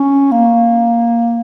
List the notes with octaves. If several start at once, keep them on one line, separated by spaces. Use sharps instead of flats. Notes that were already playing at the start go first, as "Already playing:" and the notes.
Already playing: C#4
A#3